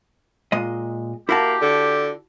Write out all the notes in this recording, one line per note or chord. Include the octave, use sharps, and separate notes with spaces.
A#2 G#3 D#5
A#3 E4 F#4 G4 A5
D3